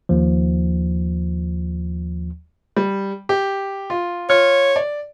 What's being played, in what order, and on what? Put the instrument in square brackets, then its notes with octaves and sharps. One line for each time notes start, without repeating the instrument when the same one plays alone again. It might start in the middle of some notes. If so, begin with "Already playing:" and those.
[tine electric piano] D#2 F3
[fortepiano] G3
G4
F4
[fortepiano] F4 F6 [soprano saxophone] C#5
[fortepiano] D5